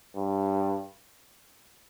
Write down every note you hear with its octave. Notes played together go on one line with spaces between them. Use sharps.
G2